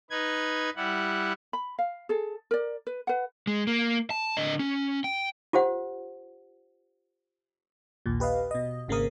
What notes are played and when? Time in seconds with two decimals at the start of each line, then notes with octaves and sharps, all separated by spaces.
0.10 D#4 B4 G#6
0.76 G3 E4 F#5
1.53 B5
1.79 F5
2.09 G#4 A4
2.51 A#4 D5
2.87 B4
3.07 B4 F#5
3.47 G#3
3.67 A#3
4.10 A5
4.37 D3 D#5
4.59 C#4
5.04 G5
5.53 F4 G4 C5 F#5
8.06 A#1 D#2 A#2
8.20 G4 B4 D#5 F5
8.51 B2 D#5
8.88 G#1 C#3 A#3 C4 A#4 D#6